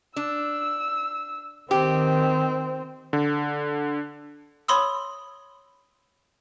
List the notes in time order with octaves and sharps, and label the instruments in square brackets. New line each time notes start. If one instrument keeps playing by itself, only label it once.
[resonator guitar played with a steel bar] D4 [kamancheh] E6
[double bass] D#3 [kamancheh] C4 [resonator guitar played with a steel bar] G4
[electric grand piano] D3
[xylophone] C#5 B5 C6 D#6 E6